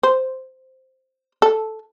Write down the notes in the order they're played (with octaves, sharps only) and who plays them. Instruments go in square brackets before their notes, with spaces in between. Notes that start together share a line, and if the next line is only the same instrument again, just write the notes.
[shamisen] C5
A4